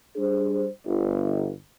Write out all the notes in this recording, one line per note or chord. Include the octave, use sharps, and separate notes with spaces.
G3 D4 G#4 C5
G1